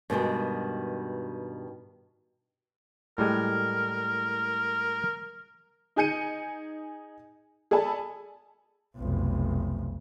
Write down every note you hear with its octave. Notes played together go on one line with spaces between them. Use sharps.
G2 B2 D#3 G#3
A2 G3 G#3 A#4
D#4 G#4 G#5 G6 C#7 D#7
G#4 A4 D5 G#5 A5 B5
F1 B1